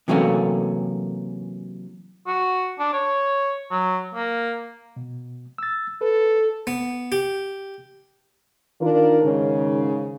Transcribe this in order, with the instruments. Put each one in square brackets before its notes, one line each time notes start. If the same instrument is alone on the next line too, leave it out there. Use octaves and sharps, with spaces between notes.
[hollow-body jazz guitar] C3 E3 F#3 A3 A#3 C#4
[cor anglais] F#4
D4
C#5
F#3
A#3
[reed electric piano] B2
E6 A6
[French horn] A4 [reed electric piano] B4
[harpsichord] B3
G4
[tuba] D#3 [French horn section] D4 F4 A#4
[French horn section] G#2 C#3